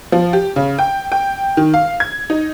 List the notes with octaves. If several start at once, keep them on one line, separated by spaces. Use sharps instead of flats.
F3
G4
C#3
G5
G5
D#3
F5
G#6
D#4